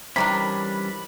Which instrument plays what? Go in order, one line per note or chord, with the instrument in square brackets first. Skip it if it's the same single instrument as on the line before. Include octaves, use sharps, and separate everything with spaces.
[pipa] C3 D#3 D4 [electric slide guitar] E3 G3 C#4 [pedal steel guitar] B5